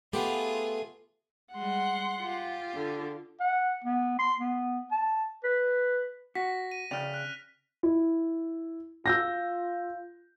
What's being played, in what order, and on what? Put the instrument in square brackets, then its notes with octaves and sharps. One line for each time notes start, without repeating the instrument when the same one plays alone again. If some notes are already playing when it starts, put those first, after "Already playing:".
[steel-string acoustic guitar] A3 [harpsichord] B3 G4 [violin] F4 G#4
[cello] G3 G#3 [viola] F#5 C6
[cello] F4 G4
[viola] D3
[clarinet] F#5
B3
C6
B3
A5
B4
[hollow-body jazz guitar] F#4 [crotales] A#6 B6
[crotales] D#7
[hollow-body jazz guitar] C#3 D5 G5 [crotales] F6 F7
[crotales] F#6
[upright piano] E4
[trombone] F4 [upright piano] E6 G6 A#6